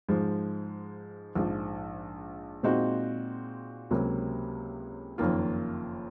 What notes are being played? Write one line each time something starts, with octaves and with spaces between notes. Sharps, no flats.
G#2 F3 G#3
A#1 G#2 F3 G#3
A#2 G#3 C4 D#4 F#4
C#2 C3 F#3 A#3
F#1 F2 D#3 A#3 F4